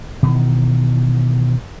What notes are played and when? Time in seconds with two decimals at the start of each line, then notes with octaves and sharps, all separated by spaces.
0.23 B2 D#3 E3